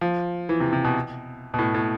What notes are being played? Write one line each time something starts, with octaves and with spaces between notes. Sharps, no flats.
F3
E3
C3
C3
B2
B2
A2
A2